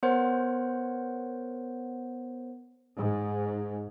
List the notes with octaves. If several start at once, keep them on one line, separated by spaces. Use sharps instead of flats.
B3 A#4 C5 C#5 F#5
G#2